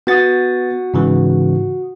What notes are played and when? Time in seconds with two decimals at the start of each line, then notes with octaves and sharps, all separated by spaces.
0.07 B3 F#4 F#5 D#6 A6
0.94 G#2 C#3 E3